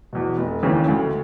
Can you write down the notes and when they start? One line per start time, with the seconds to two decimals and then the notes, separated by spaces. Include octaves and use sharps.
0.13 E2 B2
0.38 F1
0.63 D#2 C#3 E3
0.88 D2